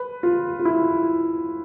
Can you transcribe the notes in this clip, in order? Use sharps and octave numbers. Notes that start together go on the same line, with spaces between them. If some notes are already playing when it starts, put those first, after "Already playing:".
Already playing: B4
F4
F4
E4